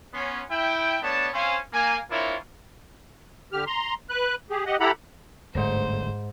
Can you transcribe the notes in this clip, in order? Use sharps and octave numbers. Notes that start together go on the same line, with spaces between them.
B3 C#4 C6
E4 G5
A3 B3 D4 C#5 A5
C4 C#4 C5 F5 G#5
A#3 G#5
C4 D4 E4 F4 A#4 C#5
D3 G4 F6
A#5 C6
B4 F#6
G4 G#4
G4 D#5 F#5
E4 G4 A4 F#5 A#5 B5
D1 G1 G#2 A3 C5 A#6